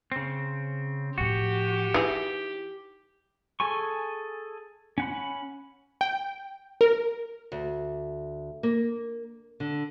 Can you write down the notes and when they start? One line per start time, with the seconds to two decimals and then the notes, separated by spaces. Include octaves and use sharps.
0.12 C#3 C4
1.18 A2 F3 F#4 G4
1.94 E3 D#4 G#4
3.60 G#4 A4 G#5 C#6
4.98 C#4 F#5 B5
6.01 G5
6.81 A#4
7.52 D2
8.63 A#3
9.60 D3